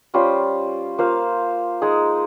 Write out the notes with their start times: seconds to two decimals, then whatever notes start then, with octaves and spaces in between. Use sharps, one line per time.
0.14 G3 C#4 F4 C5
0.98 A#3 F4 C5 F5
1.82 G#3 D#4 G#4